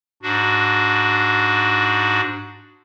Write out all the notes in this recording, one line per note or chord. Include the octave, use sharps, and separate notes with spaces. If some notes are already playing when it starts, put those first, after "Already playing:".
G#2 D4 F#4